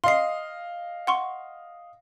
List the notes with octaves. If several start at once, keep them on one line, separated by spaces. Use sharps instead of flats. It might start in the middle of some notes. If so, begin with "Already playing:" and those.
D#5 F5 C6 C7
F#5 C6 C#6